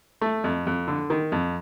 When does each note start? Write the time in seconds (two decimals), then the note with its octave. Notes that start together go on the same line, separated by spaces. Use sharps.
0.21 A3
0.44 F2
0.67 F2
0.88 D3
1.10 D#3
1.32 F2